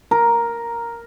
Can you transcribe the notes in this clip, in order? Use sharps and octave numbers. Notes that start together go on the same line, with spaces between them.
A#4